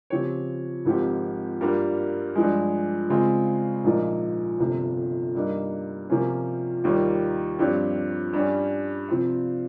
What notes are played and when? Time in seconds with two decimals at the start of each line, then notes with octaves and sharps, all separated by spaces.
0.10 C#3 F3 C4 G4 C#5
0.85 G#1 G#2 F3 C4 G4
1.61 G2 G3 A#3 F4 A#4
2.35 G2 F3 G#3
3.09 C#3 G#3 C4 F4
3.84 A#1 G#2 F3 A#3 D#4
4.59 G1 F2 C3 F3
5.35 G2 G3 A#3 D#4
6.10 C3 F3 A#3 C#4 F4
6.84 D#2 D#3 G3 A#3 F4
7.59 G2 F3 C4 G4 C#5
8.33 G2 G3 C#4
9.09 C3 F3 C4 F4